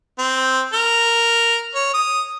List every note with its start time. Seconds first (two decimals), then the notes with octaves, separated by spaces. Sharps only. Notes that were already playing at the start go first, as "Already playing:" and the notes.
0.18 C4
0.73 A#4
1.75 C#5
1.94 D#6